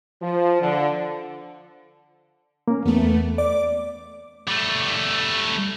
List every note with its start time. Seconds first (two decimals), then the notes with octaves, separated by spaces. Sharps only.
0.22 F3
0.62 D3
2.68 A#3 C#4
2.85 E2 A3 B3
3.38 D5 D6
4.48 G3 A3